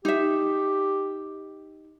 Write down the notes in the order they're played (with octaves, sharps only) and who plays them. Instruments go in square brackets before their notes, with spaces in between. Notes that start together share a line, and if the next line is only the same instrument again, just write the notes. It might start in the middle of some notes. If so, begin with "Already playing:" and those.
[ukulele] D#4 E5 [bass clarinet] G4